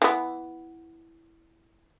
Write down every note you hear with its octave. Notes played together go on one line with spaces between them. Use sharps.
E3 B3